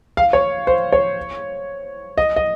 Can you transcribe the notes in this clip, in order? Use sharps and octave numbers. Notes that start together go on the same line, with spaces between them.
F5
C#5
C5
C#5
D#5
D#5